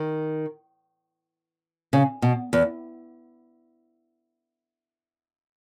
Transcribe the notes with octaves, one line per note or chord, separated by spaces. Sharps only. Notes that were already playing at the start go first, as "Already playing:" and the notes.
Already playing: D#3
C#3
B2
E2